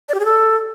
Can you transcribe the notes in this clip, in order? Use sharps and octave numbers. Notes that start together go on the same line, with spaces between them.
D5
G4
G#4
A4